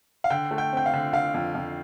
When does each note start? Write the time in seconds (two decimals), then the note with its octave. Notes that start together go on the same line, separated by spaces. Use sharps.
0.24 F5
0.30 D3 G5
0.51 A3
0.58 G5
0.73 C4 G5
0.86 F5
0.94 D3
1.13 D3 F5
1.34 F2
1.55 F2